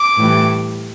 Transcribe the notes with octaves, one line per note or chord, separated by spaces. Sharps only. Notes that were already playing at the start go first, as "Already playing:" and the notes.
Already playing: D6
A2 E3 G3